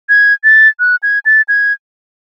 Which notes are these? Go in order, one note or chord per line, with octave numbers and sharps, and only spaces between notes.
G#6
A6
F#6
G#6
A6
G#6